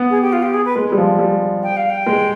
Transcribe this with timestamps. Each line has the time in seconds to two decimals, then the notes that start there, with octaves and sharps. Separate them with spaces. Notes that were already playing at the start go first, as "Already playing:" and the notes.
Already playing: B3
0.10 G#4
0.21 G4
0.32 F4
0.42 G4
0.53 G#4
0.64 B4
0.76 G#3
0.92 G3
0.98 F3
1.19 G3
1.62 G5
1.76 F5
1.89 G5
2.07 G#3